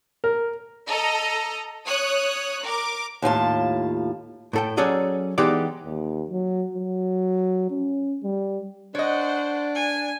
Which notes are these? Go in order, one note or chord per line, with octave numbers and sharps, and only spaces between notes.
A#4
A4 D#5 A#5
C#5 D#6 F#6
A#4 D6
D#2 A2 F4 A5
A2 A4 G5
F#3 C#4 G#4 A4 D5 D#5
E3 G#3 B3 D#4 G4 D5
D#2
F#3
F#3
C#4
G3
D4 C5 C#5 D#5 F#5
G#5